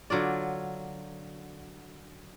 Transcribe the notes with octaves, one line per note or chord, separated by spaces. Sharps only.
D3 F#3 F4 D5